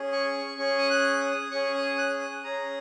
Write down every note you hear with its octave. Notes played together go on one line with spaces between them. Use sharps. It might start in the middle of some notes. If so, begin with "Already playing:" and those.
Already playing: C#4 G#4
C#6
C#4 G#4 C#6
D#6
F#6
D#6
C#4 G#4 C#6
D#6
F#6
D#6
C#4 G#4 A#5